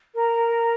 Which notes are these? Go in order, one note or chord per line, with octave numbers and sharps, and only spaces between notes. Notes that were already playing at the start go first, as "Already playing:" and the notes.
A#4